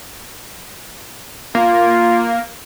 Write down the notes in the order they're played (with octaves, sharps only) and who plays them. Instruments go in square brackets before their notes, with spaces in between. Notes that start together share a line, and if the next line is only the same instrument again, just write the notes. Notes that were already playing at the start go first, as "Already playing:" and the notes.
[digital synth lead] A#3 [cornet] F4